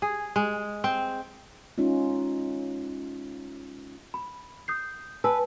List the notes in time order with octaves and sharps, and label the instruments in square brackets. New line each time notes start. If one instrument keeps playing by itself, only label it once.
[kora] G#4
G#3
C4
[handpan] G#3 C#4 D#4 F4
[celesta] B5
D#6 G6 C7
[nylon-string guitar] B4 [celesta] G#5 A5 E6